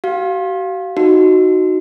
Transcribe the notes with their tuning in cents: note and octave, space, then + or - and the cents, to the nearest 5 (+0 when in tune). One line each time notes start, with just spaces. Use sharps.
F#4 +45 F5 +0
D#4 +0 F#4 +0